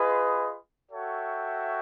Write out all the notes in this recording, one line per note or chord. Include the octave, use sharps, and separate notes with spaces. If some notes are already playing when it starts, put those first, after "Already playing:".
Already playing: F4 G#4 B4 D#5
F#4 A4 C#5 E5 G5